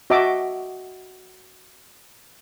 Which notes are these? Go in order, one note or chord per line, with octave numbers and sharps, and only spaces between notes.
F#4 D#5 E5 A5 D6